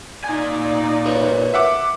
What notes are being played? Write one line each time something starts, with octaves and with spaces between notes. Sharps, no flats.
A#2 D#4 D5 G#5
A#4 B4 C#5
E5 F#5 D6